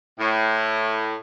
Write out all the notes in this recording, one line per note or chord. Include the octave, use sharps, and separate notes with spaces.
A2